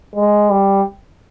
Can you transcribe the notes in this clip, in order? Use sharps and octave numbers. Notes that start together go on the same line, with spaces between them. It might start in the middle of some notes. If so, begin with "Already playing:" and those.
G#3
G3